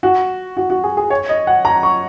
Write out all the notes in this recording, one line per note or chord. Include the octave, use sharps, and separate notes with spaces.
F#4
F#4
F#4
G#4
G#4
C#5
D#5
F#5
A#5
C#6